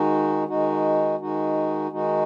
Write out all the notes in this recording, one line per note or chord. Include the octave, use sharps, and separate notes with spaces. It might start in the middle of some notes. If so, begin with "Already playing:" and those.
Already playing: D#3 G#3 D#4 F#4
D#3 G#3 D#4 F#4
D#3 G#3 D#4 F#4
D#3 G#3 D#4 F#4